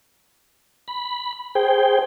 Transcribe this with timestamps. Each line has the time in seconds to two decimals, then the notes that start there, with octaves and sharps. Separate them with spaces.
0.88 B5
1.55 G#4 C5 G5